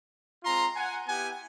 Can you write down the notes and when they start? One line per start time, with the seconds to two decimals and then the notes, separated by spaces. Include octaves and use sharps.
0.43 G#3 C4 F4 A#5 C6
0.75 F#5 G#5
1.07 B3 E4 G4 F#5 G#5